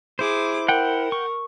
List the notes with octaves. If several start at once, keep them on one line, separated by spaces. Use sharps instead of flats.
E4 G#4 C5 D6
A#4 F#5 G5
C#6